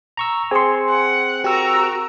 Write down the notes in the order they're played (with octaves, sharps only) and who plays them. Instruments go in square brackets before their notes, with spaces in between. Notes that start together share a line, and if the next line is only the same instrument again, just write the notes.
[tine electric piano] A#5 C#6 E6
[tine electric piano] C4 [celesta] G#4 D#6 C#7 [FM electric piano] G#5 C6
[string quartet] F#5
[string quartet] F#4 A#4 A#5 [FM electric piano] G4 E6